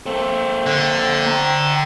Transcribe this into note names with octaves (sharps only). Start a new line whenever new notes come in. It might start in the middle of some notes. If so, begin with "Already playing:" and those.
A#3 C4 A4
D3
G5 A#5